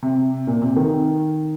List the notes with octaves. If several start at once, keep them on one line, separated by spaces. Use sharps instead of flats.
C3
A#2
C3
D#3